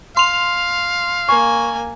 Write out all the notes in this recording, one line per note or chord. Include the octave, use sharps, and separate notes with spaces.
F5 C6 F7
A#3 G#5 C#6